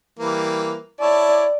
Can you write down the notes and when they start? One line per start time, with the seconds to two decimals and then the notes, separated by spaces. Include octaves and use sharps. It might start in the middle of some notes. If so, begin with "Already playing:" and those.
0.19 E3 G3 A#3
1.01 E4 C#5 D5 A5